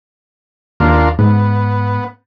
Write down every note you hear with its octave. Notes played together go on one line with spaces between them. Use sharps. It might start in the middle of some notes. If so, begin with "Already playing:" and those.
D#2 D4 F4 A#4
G#2 B3